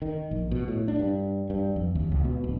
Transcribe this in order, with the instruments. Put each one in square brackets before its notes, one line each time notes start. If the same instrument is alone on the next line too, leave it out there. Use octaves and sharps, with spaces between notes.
[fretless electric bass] D#3
A#1
B2
A2
D4
G2
G2
F2
D#2
C#2
B2
D1